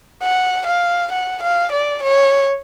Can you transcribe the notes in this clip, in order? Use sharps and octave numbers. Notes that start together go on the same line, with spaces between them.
F#5
F5
F#5
F5
D5
C#5